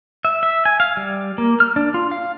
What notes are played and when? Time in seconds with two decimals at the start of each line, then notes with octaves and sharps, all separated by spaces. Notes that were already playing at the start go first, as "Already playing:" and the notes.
0.25 E5
0.43 E5
0.65 G#5
0.80 F5
0.97 G3
1.38 A#3
1.60 F6
1.76 D4
1.94 F4
2.11 F5